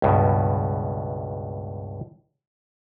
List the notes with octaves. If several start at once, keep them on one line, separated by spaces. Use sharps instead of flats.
C#2 G2 B2